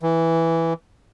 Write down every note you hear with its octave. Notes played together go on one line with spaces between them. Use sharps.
E3